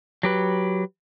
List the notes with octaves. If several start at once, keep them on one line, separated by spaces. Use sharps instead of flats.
F#3 G4 B4